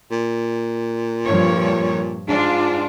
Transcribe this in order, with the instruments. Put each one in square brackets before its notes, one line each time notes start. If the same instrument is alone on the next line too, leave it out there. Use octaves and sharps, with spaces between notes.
[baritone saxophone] A#2
[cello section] G2 F3 C#5
[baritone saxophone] G#2 [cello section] D4 F4